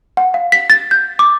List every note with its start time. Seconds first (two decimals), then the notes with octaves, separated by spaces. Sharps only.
0.17 F#5
0.34 F5
0.52 B6
0.70 A6
0.91 G6
1.19 D6